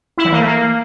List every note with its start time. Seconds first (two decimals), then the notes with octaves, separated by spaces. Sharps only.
0.18 E4
0.25 E3
0.32 A#3
0.40 A3
0.47 A#3